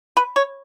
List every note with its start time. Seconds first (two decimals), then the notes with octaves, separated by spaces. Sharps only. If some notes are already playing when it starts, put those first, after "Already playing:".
0.17 B4
0.36 C#5